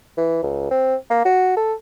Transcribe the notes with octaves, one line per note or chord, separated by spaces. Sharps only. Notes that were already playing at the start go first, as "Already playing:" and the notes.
E3
C#2
C4
A#3
F#4
A4